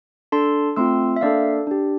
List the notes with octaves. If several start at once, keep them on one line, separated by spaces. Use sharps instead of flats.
D4 A4 A5 C6
A3 C4 F4 C6 E6
E5
A#3 D4 A4 D5 F5
D4 G4